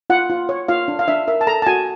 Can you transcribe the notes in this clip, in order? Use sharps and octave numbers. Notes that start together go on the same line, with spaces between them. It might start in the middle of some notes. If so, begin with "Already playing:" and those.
F4 F#5
F4
C#5
F4 F5
D4
F5
D4 E5
A#4 E5
A5
A4 A#5
A5
F#4 G#5